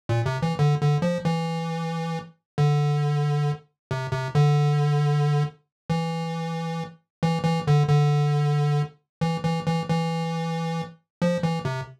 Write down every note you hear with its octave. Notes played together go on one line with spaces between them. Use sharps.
A#2
C3
E3
D3
D3
F3
E3
D3
C3
C3
D3
E3
E3
E3
D3
D3
E3
E3
E3
E3
F3
E3
C3